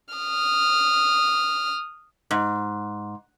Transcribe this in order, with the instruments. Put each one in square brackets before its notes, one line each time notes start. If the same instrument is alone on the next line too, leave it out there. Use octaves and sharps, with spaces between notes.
[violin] D#6 F6
[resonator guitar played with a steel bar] G#2